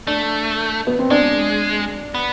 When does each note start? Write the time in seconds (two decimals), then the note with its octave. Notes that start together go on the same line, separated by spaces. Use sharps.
0.07 A3 D4
0.87 B3
0.99 C4
1.11 G#3 D4
2.14 B3